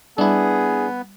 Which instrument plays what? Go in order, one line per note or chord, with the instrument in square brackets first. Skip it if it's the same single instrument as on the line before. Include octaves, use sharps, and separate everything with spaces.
[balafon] G3 [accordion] B3 [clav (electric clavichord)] D4 E4 [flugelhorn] G#4